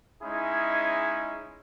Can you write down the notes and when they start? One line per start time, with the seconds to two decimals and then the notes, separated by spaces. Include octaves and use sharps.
0.23 G#3 C#4 D#4 E4 G#4